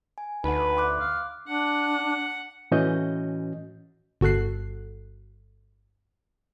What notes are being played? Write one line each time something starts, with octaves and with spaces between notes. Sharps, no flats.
G#5
D2 D#4 B4 F#5
C6 D6 F#6
F5
D4 F#5
A2 E3 C#4 F#4 D#5 G6
G1 F#4 A4 F#6 C7